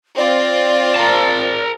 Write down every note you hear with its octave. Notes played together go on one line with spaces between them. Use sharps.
C4 F4 D5
A#4 A5